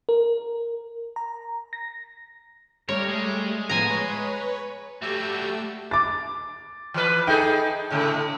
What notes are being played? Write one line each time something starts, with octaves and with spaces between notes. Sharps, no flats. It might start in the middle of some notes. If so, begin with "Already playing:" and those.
A#4
A#5
A#6
G3 A3 A#4 C#5
G#3
A2 F3 B3 G#5 A#5
B4 C#5
G3 A3 F#4 G4 E6
D6 A6
E3 B4
D#4 G#4 A4 G5
A2 C#3 A3